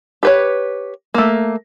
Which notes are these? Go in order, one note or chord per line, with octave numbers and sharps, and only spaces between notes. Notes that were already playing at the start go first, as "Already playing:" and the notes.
G4 B4 C#5
A3 A#3